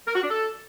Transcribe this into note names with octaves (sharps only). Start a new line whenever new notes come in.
A#4
F#4
D4
A4